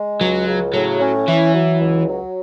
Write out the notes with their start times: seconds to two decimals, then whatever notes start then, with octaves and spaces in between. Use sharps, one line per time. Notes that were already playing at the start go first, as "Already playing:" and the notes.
Already playing: G#3
0.20 C#2 F#3
0.47 C#3
0.74 A2 F#3
1.00 C#4
1.28 E3 E4
1.54 F#3
1.81 C#2
2.08 F#3